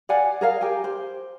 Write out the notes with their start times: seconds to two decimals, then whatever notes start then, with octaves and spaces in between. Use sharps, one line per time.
0.09 D5 F5 F#5 G#5
0.41 G#4 A#4 F5
0.61 G4 G5 G#5
0.84 C5